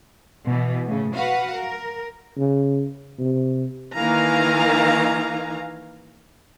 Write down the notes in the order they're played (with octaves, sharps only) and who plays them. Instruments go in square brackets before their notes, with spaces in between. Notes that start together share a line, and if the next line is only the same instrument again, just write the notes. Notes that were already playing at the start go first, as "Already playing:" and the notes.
[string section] B2 E3
A2 C#3
F#4 B4 F5 F#5
A#4
[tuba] C#3
C3
[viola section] D#3 E3 A#3 F5 G#5 A#5